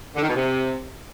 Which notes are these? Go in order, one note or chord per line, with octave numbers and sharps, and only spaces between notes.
D3
D#3
B2
C3